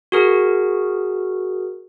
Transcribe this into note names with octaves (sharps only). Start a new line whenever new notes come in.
F#4 G#4 A#4